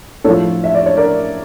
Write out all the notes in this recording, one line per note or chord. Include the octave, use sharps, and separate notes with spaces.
A2 F3 A4 C#5
E5
D5
C#5
A#4 D5